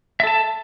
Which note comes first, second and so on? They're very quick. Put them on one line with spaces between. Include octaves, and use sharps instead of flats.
E5 A4 A5